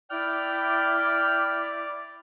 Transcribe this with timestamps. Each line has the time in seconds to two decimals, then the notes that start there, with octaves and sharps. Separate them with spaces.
0.10 E4 D5 G5 B5 D6 F6